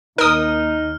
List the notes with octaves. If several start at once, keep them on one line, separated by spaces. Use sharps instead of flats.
D#2 D#4 A#4 D#6 F6